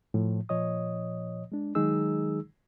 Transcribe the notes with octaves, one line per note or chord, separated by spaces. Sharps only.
A2 F3
A#2 F3 C#5 D#5 D#6
G#3 D4
D#3 F#3 G#3 D#4 G#4 E6